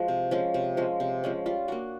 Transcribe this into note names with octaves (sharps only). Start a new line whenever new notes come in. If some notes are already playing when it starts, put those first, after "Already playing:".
Already playing: F3 G#3 F#4
C3
F3 G#3 C#4
C3
F3 G#3 C#4
C3
F3 G#3 C#4
G3 F4
A#3 D4 F#4